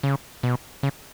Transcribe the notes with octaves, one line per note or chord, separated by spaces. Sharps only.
C#3
B2
C#3